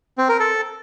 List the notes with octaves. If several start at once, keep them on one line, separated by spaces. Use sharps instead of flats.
C4
A#4
A4